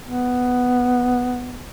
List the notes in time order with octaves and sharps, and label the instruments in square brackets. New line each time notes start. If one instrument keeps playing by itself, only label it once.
[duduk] B3